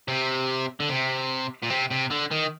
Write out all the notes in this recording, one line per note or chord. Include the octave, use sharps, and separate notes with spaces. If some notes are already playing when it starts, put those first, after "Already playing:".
C3
D3
C3
A#2
C3
C3
D3
D#3